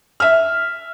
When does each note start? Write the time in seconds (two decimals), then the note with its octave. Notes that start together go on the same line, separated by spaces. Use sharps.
0.20 E5 F6